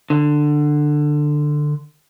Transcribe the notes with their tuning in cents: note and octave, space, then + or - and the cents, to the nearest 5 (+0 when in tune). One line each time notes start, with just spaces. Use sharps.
D3 +15